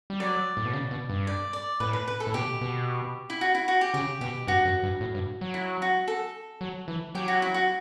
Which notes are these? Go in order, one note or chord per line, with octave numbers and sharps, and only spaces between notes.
G3
F#3 D5
A2
B2
C#3
B2
G2
D5
D5
A2 B4
B4
B4
A4
A2
B2 G4
B2
E4
F#4
E4
F#4
G4
C#3 G4
B2 G4
G2 F#4
F#2
G2
A2
G2
F#3
E4
F#4
A4
F#3
E3
F#3 G4
F#4
E4
F#4